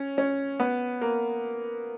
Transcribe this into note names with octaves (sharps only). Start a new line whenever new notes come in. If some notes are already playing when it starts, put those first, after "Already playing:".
Already playing: C#4
C#4
B3
A#3